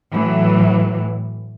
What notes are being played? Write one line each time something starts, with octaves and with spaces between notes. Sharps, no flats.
A2 E3 F#3